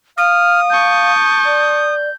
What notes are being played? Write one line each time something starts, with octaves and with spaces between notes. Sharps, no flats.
F5 D#6 F6
A5 C#6 G6
D5